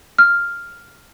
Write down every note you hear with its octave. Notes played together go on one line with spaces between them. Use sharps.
F6